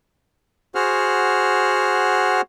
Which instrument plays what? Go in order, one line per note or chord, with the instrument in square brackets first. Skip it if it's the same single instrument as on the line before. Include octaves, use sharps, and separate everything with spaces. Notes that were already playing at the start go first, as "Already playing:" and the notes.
[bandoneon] F#4 G#4 C5 F#5 F6